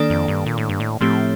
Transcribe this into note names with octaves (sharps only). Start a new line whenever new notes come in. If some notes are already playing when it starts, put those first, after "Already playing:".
Already playing: D#3 A#3 D4 A4 D5
F2
G2
A#2
A2
G2
A2
A2 F3 A3 C4 G4